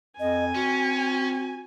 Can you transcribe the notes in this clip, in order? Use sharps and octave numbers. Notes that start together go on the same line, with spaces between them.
F2 D#5 G#5
C4 C#4 F#4